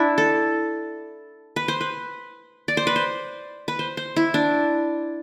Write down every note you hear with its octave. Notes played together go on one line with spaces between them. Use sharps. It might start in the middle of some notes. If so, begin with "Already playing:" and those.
Already playing: D4 E4
A4
B4
C5
B4
D5
C5
B4
C5
B4
C5
C5
E4
D4